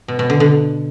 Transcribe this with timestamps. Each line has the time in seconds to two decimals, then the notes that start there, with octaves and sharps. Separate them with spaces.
0.08 B2
0.19 B2
0.30 D3
0.40 D3